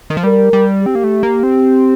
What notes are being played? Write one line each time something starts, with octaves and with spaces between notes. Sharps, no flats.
D#3
F3
G3 A#4
G3
C4 G4
A#3
A3
A#3
C4